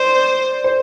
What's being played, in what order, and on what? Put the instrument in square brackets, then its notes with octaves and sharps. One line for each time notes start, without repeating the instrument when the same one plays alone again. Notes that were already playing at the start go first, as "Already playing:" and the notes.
Already playing: [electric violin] C5 [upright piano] D5
[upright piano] C5